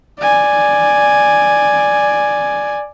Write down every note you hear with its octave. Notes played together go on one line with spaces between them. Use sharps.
D5 G#5